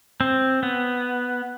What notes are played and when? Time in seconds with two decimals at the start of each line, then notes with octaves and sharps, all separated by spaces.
0.21 C4
0.63 B3